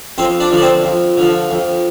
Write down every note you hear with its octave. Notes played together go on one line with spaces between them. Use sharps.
F2 C4 C5
D4 D5
D3 F3
D5
C4 C5
F2
D3 F3
F2